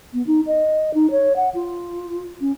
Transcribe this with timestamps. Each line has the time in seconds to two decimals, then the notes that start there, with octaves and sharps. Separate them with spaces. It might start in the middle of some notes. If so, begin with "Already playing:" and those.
0.13 B3
0.27 D#4
0.47 D#5
0.94 D#4
1.11 C#5
1.36 F#5
1.54 F4
2.41 C#4